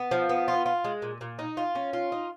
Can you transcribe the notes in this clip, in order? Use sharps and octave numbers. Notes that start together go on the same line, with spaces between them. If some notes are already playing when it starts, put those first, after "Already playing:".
Already playing: B3
F3
B3
F4
F4
G#3
A#2
A#2
D#4
F4
C#4
F4
D#4